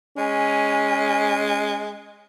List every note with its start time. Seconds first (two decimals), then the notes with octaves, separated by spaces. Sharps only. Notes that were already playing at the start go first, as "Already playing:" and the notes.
0.18 G#3 C#4